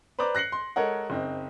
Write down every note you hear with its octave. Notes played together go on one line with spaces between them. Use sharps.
B4 C5 D5 A#5 D6
F#6 A#6 C7 C#7 F#7
C6
G#3 A4 A#4 C#5 F#5
F#1 C4 D#4